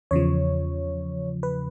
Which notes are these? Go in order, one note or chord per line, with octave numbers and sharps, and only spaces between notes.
E2 C#3 F3 C#5
B4